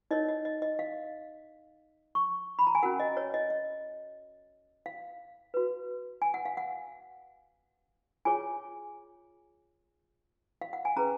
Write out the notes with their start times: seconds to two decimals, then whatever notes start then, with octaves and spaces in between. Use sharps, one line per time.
0.11 D#4 A#4 C#5 D#5
0.29 D#5
0.45 D#5
0.62 D#5
0.79 F5
2.15 C#6
2.59 B5
2.67 A#5
2.75 G#5
2.83 C#4 F#4 A#4 F#5
3.00 D#5
3.17 C#5
3.34 D#5
3.50 D#5
4.86 F5
5.54 F#4 B4
6.22 G#5
6.34 F#5
6.45 F5
6.57 F#5
8.25 F4 G#4 C#5 G#5
10.62 F5
10.73 F#5
10.85 G#5
10.96 C#4 G#4 B4 A#5